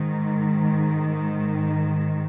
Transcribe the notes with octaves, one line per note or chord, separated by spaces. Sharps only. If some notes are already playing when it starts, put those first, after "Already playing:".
Already playing: G#2 D#3